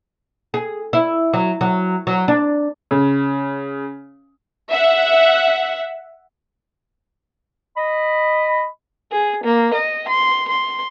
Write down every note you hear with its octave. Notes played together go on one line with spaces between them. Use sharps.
G#4
E4
F#3
F#3
F#3
D4
C#3
E5 F#5
D#5 B5
G#4
A#3
D#5
C6
C6